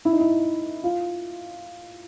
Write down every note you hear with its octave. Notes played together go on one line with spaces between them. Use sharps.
E4
D#4
E4
F4